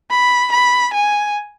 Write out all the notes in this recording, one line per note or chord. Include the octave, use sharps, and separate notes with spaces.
B5
B5
G#5